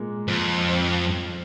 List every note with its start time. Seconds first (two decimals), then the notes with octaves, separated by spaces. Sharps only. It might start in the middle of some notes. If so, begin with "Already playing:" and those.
Already playing: A#2 G#3 A#3
0.27 F2 F3
0.68 C4